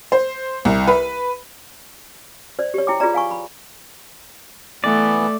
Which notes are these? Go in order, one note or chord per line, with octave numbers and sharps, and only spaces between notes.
C5
C2
B4
C5 D5
G4 C#5
E4 G5 D6
F4 G#4 B4 D5 A#5
F5 G#5 C#6
B5
E3 A3 B3 D5